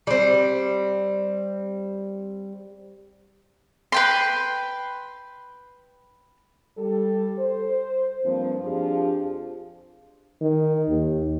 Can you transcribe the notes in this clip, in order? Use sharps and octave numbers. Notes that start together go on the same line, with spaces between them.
G3 C4
B4 G5 C6
G3 A4
C5
G2 F3 A#3 C4
F2 F3 D4 F4 G4 G#4
D#3
D#2